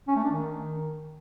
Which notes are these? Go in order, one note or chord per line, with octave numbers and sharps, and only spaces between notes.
C#4
A3
D4
D#3